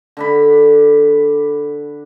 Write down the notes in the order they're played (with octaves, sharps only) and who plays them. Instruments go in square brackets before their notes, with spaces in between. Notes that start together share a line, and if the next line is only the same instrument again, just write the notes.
[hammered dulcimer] D3 D4 B5